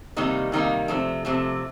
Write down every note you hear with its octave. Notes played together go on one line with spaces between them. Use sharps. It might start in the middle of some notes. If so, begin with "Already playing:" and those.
C3 D#3 G3 A#3 D#4
C3 D#3 G3 A#3 D#4
C3 F3 A3
C3 F3 A3